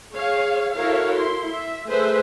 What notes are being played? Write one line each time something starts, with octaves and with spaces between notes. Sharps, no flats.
G#4 C#5 F5
E4 F#4 A4 A#4 C#5 F5
E4 C6
E5
A3 G#4 B4 C5 E5